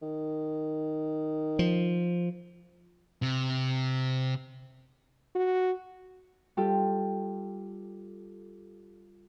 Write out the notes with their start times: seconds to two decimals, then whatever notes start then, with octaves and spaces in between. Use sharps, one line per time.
0.02 D#3
1.59 F3
3.22 C3
5.35 F#4
6.57 G3 F4 G4 A4